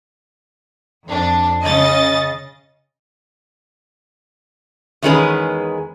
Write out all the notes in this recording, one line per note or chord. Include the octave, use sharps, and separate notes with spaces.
F2 D4
C#3 D#5 A6
E2 D#3 G#3 C#4 G#4 B4